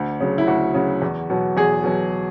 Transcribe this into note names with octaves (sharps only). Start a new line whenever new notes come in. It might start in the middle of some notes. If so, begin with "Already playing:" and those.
Already playing: D2 D4
C#3 F#3
E4
D2 F#4
C#3 F#3
E2
B2 F#3
E2 G#4
B2 F#3